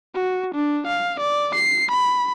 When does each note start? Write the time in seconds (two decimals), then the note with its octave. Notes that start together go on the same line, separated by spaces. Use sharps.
0.15 F#4
0.55 D4
0.87 F5
1.20 D5
1.55 C7
1.91 B5